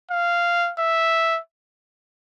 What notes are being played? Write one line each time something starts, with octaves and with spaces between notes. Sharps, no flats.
F5
E5